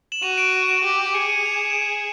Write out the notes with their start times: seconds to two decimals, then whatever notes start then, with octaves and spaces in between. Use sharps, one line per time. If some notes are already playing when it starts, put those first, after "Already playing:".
0.12 E7 F#7
0.22 F#4 D#7 F7
0.38 D7 E7
0.48 D#7
0.52 D7 E7
0.68 D7 E7
0.83 G4
1.06 D7
1.14 G#4 C#7 D#7
1.29 C#7 D#7
1.45 F7
1.54 E7
1.62 D#7
1.70 D7 E7